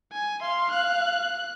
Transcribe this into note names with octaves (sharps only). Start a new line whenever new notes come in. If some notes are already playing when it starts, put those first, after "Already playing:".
G#5
F5 C6
F#6